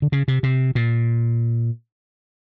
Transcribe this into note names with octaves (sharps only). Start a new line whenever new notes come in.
D3
C#3
C3
C3
A#2